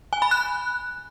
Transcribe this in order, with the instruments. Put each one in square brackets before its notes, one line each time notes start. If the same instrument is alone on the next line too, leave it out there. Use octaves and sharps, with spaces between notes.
[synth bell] G#5
B5
F#6